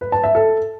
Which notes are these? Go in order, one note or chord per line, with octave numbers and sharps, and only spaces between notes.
B4
A5
E5
A4